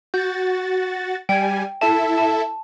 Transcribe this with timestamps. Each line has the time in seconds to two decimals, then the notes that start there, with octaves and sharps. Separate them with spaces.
0.14 F#4 G6 A6
1.29 G3 G5 G#5
1.81 E4 A4 E5 A5
2.18 A5